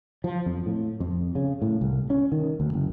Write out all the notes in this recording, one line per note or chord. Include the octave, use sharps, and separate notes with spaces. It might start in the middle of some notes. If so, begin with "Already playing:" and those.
F3
F2
A2
F2
C#3
A2
C2
C#4
D#3
D2
F#1